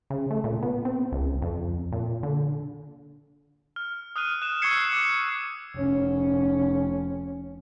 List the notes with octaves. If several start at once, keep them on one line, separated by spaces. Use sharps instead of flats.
C#3
A3
A#2
B3
C4
C#2
F2
A#2
D3
F6
D#6 F6 F#6 D#7
F#6 E7
C#6 E6 F6 G#6 C7 C#7
D6
F1 C#4